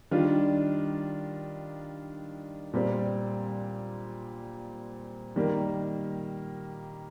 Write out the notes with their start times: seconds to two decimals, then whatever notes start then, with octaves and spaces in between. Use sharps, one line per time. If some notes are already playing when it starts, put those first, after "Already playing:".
0.11 D#3 G3 D4 F4
2.73 A#2 G3 C4
5.36 D#3 G3 A#3